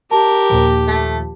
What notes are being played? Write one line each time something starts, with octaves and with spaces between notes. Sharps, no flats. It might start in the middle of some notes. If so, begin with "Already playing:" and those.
G4 A#4 A5
D#2 A#2 F3
A3